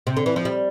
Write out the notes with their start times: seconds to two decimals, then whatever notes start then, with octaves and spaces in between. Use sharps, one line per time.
0.07 C3
0.17 D3
0.26 E3
0.36 F3
0.45 G3